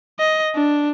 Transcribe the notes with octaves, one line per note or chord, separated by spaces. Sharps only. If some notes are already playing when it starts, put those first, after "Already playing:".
D#5
D4